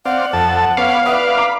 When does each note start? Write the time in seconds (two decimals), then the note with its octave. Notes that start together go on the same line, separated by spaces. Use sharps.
0.06 C4 D5 F5 F#5
0.33 F2 A4 A5
0.77 B3 C#5 F5 B5 D6
1.06 B4 D5 E5 F#5 D6 D#6
1.37 A#5 B5 D6 D7